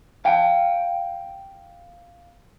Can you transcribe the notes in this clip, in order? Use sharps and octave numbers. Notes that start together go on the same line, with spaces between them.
F5 G5